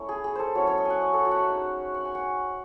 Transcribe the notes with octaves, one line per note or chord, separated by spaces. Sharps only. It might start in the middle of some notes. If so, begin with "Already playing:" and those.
Already playing: A3 C#4 E4 C#5
G#4
G#4
A4 C5
F#3 C#4 E4 C#5
C#5
D#5
F#5 G#5
D#5
A4
F#4
E5 F#5
G#3 D#4
F#5
G#5
F#5